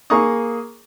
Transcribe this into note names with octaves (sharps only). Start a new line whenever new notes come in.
A#3 G#4 A#5 C#6 D#6